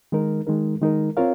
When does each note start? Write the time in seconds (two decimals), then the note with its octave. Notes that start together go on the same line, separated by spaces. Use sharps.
0.12 D#3 G#3 D#4 A#4
0.47 D#3 G#3 D#4 A#4
0.82 D#3 G#3 D#4 A#4
1.17 C4 F4 A#4 C#5 F5